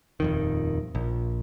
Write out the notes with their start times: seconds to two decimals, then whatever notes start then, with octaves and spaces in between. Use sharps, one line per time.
0.20 D#1 F2 D#3
0.95 A#1